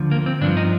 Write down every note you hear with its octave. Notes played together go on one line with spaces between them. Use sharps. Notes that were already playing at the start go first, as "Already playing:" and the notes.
Already playing: D2 D3 F3
A#3
C4
G2 F3 D4
D#4